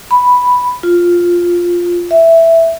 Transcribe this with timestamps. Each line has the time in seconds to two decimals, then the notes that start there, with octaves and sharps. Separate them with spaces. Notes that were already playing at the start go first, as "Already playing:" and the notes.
0.11 B5
0.83 F4
2.11 E5